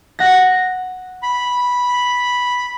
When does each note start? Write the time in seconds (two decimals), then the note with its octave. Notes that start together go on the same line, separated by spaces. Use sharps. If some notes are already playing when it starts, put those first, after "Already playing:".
0.19 F#5 A#6
1.23 B5